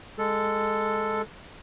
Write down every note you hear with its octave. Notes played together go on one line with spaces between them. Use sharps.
G#3 A4